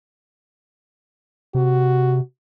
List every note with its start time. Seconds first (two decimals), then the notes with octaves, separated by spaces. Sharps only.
1.55 C3 F#4